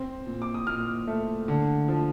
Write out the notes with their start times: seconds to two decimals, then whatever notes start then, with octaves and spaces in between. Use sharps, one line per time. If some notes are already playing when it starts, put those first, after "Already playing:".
Already playing: C4
0.26 A#2
0.42 D6
0.54 D#6
0.67 A#2 F6
1.07 A3
1.48 D3
1.88 F3